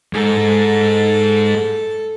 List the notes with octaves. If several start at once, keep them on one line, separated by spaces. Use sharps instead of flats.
G#2 A4